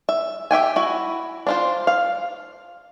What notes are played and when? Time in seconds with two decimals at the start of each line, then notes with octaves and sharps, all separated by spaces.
0.09 E5
0.51 G4 E5 G5 G#5
0.76 E4 F#4
1.47 D4 F4 C5
1.87 F5